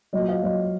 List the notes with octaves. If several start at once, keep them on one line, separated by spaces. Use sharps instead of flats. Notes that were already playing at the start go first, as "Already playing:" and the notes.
A#2 F#3 C#5 D#5
D#5 F5
A#2 F#3 C#5 D#5